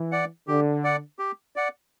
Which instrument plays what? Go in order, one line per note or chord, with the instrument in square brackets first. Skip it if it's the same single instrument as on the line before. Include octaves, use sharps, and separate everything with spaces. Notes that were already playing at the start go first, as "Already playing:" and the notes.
Already playing: [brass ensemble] E3
[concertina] D5 F#5
[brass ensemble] D3 [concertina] G4
[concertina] D5 F#5
G4
D5 F#5